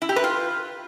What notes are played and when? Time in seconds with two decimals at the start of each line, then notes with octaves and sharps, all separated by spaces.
0.02 E4
0.09 G4
0.16 B4
0.24 F4